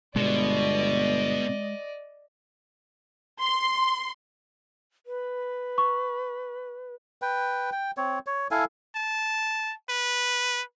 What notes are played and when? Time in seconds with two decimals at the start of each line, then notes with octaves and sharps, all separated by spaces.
0.16 G1 B2 G#3 D5 D#5
3.41 C6
5.06 B4
5.78 C#6
7.22 B4 G5
7.72 G5
7.97 C4 C#5
8.27 C#5
8.51 E4 A4 F5 G#5
8.96 A5
9.90 B4